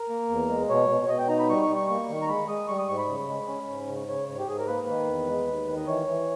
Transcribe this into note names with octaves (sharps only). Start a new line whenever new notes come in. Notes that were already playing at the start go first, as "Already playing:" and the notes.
Already playing: A#4
A#3
E2
G#3
B2 C#5
B2
C#5
B2 D#5
G5
D#4 A#5
B5
G3 C#6
C#6
G3
C#6
A#3 C#6
D#3
A#5
G#3 B5
G#3 D#6
G3 C#6
D#6
G#2 C#6
B5
C#3
G#3
C#4
G#2
C#3
C#3 C#5
G#2 C#5
G4
G#2 G#4
A#4
A#3 B4
D#3
E2
G#3
D#2
D#3
D#5
E3 C#5
E3